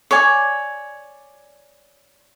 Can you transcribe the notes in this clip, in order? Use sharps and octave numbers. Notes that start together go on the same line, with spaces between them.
C#5 D5 G#5